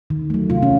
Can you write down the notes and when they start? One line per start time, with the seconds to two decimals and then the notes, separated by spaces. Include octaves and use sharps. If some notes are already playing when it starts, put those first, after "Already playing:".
0.10 D#3
0.30 F#3 A3
0.50 C3 F4
0.62 C#4